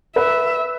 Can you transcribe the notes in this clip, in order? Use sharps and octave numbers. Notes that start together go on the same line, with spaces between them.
B4 E5